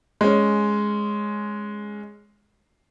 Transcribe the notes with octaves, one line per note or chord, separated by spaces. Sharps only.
G#3 C#4